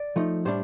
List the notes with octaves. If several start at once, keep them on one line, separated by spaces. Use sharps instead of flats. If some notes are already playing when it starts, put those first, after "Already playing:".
Already playing: D5
F3 A3 D#4
A2 G3 D4 C5